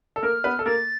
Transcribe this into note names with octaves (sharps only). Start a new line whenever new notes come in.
A4
A#3 A#4 F6
B3 B4
A4
A#3 A#4 A6